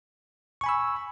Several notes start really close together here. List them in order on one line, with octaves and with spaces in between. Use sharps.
C#6 G#5 B5 E6